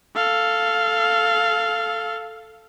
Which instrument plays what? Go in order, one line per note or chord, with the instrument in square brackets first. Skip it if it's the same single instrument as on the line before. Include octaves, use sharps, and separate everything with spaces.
[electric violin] A4 F5